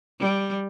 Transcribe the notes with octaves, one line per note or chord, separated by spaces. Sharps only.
G3